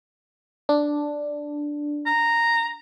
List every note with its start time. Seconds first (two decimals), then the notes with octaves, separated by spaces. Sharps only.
0.69 D4
2.06 A#5